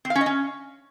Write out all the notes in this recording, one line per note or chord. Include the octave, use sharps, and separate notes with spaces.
C4
F5
C#4
D#5
C#4